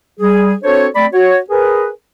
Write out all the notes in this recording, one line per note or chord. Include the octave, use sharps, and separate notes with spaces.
G3 G#4
C4 D4 F#4 A4 C5 C#5
A3 C4 D5 B5
F#4 C#5
G#4 A#4 B4